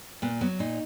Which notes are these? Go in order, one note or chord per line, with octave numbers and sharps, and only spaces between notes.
A#2 B3
F#3 B3
A#2 D#4